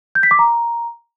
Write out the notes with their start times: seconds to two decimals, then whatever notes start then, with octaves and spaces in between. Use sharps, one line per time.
0.15 G6
0.23 B6
0.31 D6
0.39 A#5